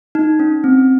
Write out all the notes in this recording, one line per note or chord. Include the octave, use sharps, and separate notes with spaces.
D#4
C#4
C4